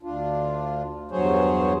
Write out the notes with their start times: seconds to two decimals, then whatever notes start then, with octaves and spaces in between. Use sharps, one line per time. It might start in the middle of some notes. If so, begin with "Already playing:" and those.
0.03 D2 D4 F4
1.11 E2 G2 F#3 G#4 C5 C#5